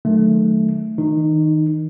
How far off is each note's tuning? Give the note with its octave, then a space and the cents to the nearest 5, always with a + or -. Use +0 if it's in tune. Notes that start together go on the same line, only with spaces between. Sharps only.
D#3 -25 F#3 +0 A3 -5
D#3 +30 D#4 -20